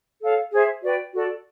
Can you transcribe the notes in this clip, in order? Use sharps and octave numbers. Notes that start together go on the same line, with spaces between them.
A4 C#5 F5
G#4 C5 E5
F#4 B4 D5 G5
F#4 A4 D5